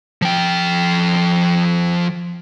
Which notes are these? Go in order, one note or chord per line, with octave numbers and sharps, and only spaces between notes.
F3 G5